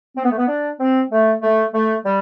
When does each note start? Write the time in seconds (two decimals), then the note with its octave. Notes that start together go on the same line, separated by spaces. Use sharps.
0.17 C4
0.24 B3
0.31 A3
0.37 B3
0.48 D4
0.79 C4
1.10 A3
1.42 A3
1.73 A3
2.04 G3